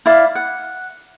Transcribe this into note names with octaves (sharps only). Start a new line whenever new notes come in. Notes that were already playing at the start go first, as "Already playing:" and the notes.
E4 D5 F5
F#5